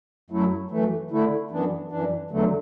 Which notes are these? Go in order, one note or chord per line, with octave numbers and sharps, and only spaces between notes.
F#2 F#3 A3 E4
F#2 E3 A3
D3 A3 E4
F#2 E3 B3 D4
F#2 E3 D4
E2 D3 F#3 A3